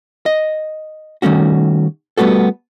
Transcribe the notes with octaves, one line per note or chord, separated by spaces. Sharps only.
D#5
D#3 G3 A3 C#4 F#4
G3 A3 B3 F#4 A4